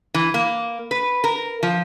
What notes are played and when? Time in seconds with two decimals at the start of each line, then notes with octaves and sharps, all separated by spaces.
0.14 E3
0.34 A#3
0.91 B4
1.24 A#4
1.63 F3